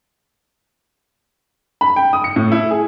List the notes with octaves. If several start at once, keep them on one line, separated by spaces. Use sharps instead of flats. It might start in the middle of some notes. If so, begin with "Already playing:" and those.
B5
G5
D#6
C#7
A2
E4
G#4